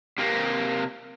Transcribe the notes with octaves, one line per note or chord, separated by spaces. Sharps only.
C3 A#3